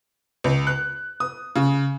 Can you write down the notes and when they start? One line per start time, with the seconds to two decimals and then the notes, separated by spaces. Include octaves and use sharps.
0.44 C#2
0.67 F#6
1.20 D#6
1.56 C#3